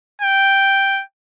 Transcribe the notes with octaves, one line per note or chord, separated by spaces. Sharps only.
G5